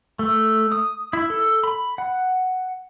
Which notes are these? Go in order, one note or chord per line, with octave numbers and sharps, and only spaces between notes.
A3
D#6
E4
A4
B5
F#5